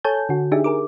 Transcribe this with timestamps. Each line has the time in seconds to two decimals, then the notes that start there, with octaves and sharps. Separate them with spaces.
0.04 A4 C#5 G#5 A5 G6
0.29 D3 F#4
0.52 D4 D#4 G4 G#4 E5
0.64 G#4 A#4 D6